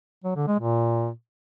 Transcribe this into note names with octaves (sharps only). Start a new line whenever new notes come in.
F#3
D3
G#3
A#2